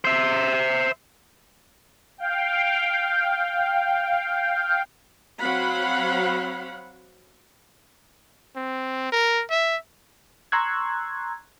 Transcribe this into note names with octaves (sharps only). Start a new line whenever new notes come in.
C5 E5
F5 G5
F#3 C4 F5 F#5 B5
C4
A#4
E5
A#5 C6 C#6 E6 F#6 G#6